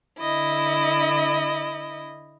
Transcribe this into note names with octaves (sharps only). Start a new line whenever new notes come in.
D3 E4 D#5